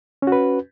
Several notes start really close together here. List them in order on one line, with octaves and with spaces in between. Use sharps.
C#4 F#4 B4